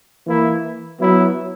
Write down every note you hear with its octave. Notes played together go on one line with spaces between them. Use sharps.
E3 A#3 E4
F#3 B3 E4